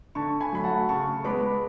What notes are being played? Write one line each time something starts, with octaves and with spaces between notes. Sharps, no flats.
D3 A5 C#6
G#5 B5
F#3 A3 B5
F#5 A5
C#3 A5 C#6
G#3 B3 B5 D6